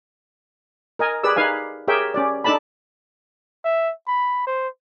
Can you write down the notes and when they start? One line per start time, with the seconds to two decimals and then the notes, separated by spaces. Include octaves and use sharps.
0.99 A#4 D#5 G#5
1.23 G4 G#4 B4 D5 E6
1.36 D#4 B4 F5 G#5
1.88 G4 G#4 A#4 C#5 E5 G5
2.14 C#4 G4 D5
2.44 D4 D#4 A4 D5 A5 B5
3.64 E5
4.07 B5
4.47 C5